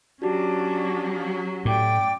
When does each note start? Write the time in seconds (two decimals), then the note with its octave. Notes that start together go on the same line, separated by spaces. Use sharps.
0.22 F#3 C#4 D4 F#4 G4
1.65 A2 D5 G5 D6